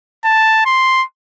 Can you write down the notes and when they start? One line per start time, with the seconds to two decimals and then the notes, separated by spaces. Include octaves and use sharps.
0.24 A5
0.66 C6